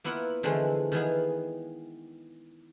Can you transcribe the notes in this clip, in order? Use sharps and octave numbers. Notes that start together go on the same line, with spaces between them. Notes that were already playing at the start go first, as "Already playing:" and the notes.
A#3 B3 E4 F4 F#5
D3 E3 F3 G#3 A3
D#3 E3 B3 G#4